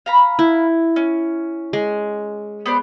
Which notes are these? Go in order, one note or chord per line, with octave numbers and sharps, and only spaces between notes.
F5 A#5 B5
E4
C#4
G#3
B3 C5 D5